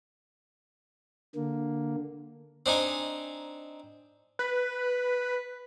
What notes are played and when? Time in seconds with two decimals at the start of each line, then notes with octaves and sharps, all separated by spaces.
1.36 D3 A#3
2.66 C4 D4 D#4 G#5
4.39 B4